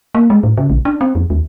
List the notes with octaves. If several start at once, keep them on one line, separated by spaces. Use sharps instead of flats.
A#3
G#3
A2
C#3
A#1
D4
C4
F2
D#2